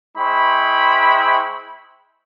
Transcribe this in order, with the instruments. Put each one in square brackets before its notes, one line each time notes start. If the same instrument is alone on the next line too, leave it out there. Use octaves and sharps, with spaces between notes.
[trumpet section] G#3 E4 C5 G5 B5 C#6